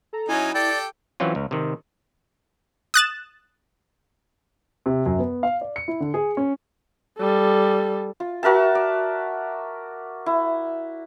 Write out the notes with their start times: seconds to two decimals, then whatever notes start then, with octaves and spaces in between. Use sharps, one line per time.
0.13 A4 A#5
0.29 F#3 C#4 D#4 E4 G#5
0.54 G4 A4 D5 G5
1.20 E3 F#3 C4 C#4 F4
1.35 C#2
1.51 C3 D#3
2.94 D#6 F#6 A6 E7
4.86 C3
5.06 F#2
5.19 B3
5.43 F5
5.61 D5
5.76 C#7
5.88 E4
6.00 D3
6.14 G#4
6.37 C#4
7.18 G3 A4
8.20 F4
8.43 F#4 A#4 E5 A5
8.75 D5
10.26 E4